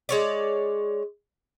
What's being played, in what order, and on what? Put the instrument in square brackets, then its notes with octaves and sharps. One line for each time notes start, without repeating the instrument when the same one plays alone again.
[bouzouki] G#3 C#5 D5